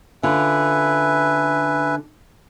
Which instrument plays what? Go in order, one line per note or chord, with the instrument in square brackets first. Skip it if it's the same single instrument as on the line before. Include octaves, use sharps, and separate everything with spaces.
[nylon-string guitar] D3 C#4 F4 [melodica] B4 E5 G#5